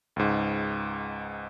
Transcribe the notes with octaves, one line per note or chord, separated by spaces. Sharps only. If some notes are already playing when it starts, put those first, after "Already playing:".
C#2 G#2